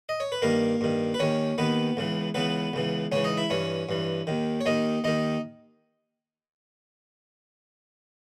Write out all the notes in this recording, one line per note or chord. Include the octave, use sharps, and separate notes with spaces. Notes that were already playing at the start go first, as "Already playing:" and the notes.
D#5
C#5
B4
G2 D#3 A#3 A#4
G2 D#3
B4
D#2 D#3 C#4 C#5
D#2 D#3 B3 B4
C#2 C#3 E3
C#2 C#3 E3 B3 B4
C#2 C#3 E3
C#2 C#3 E3 C#4 C#5
D#4 D#5
E4 E5
G2 E3 C#4 C#5
G2 E3
D#2 D#3
C#5
D#2 D#3 D#4 D#5
D#2 D#3 D#4 D#5